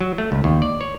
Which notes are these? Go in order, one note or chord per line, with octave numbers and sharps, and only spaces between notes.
F#3
A3
C#2
D#2
D5
C#5